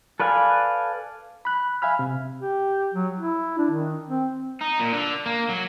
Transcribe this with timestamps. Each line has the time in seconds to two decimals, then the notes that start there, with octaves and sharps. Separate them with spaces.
0.20 A4 B4 D5 F5 G#5
1.45 B5 F#6
1.82 E5 F5 G#5 B5 F6
1.99 C3
2.40 G4
2.94 F#3
3.18 E4
3.58 D4
3.71 D#3
4.09 C4
4.61 D#4
4.79 A#2
4.93 D3
5.26 A#3
5.49 F#3